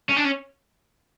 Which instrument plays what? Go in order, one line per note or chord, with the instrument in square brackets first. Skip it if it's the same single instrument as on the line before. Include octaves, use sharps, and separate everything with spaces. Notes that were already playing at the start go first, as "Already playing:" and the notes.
[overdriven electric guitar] C#4
D4
C#4